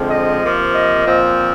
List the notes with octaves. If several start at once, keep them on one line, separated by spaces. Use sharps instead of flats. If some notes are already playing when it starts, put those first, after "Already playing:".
Already playing: D3 F3 G#3 C4
D#5
C3 F3 A#3
D#5
A#2 F3 C4